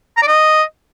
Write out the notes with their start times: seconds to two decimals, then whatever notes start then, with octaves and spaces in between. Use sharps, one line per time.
0.17 A#5
0.22 D5
0.28 D#5